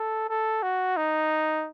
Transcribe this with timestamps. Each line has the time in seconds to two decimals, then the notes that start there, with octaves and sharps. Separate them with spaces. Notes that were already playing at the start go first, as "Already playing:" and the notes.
Already playing: A4
0.29 A4
0.63 F#4
0.97 D#4